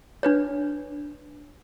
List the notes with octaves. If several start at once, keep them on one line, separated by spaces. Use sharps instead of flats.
D4 B4 C#5